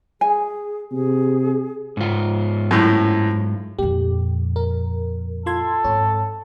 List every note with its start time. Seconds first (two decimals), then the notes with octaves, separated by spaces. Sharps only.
0.21 G#4 G#5
0.92 C3 G#4
1.97 G#2 F4
2.71 F#2 A2
3.78 F2 A#2 G4
4.56 A#4
5.46 F4 A4 C6 G#6
5.84 G#2 C4 C#5